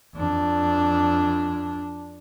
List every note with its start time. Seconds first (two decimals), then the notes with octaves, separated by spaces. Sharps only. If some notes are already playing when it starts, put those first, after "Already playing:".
0.15 F2 D4